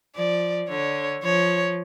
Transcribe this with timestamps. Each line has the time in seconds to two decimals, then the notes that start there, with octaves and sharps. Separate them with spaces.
0.16 F3 D5
0.69 D3 C#5
1.23 F3 C#5